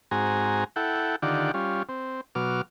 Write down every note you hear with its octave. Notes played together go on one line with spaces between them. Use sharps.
G#2 C4 F#4 G#5 A#5
E4 A4 F#5 G5
D3 D#3 F4 G4 D5 F#5
G3 C#4 F4
C4
B2 F#3 D6 F6